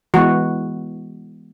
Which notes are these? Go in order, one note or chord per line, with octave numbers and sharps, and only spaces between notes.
E3 G#3 B3 F#4